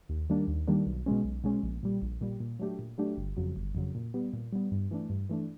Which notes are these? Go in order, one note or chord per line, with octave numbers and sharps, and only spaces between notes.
D#2
D#3 G3 A#3 D4
D#2
D#3 G3 A#3 D4
B1
B2 G#3 C#4
B1
B2 G#3 C#4
A#1
A#2 G3
A#1
A#2 G3
A#2
F#3 A3 D4 G4
A#2
F#3 A3 D4 G4
G1
F2 C#3 F#3
G1
F2 C#3 F#3
A#2
G3 B3
A#2
G3 B3
G2
E3 A3 D4
G2
E3 A3 D4